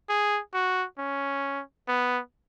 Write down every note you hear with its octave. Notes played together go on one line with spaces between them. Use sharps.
G#4
F#4
C#4
B3